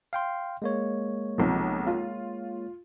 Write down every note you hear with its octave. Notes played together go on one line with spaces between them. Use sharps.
F5 G5 C6
G#3 A#3 C#5
B1 C3 F3
F4